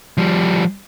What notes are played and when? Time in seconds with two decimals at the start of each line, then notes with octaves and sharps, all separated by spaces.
0.18 F3 G3